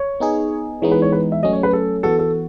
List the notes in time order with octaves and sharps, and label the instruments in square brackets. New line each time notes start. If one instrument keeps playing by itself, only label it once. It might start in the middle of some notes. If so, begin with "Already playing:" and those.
Already playing: [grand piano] C#5
[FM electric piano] B3 D#4 G#4
[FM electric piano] E3 G#3 B3 D#4 [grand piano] C#5
[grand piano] B4
C#5
B4
E5
[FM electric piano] F#3 A3 C#4 [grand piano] D#5
[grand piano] C#5
B4
A4
[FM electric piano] E3 B3 F#4 [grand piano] A4
[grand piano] A4